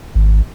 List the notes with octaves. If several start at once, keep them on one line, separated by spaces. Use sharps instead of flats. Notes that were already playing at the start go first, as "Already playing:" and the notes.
G#1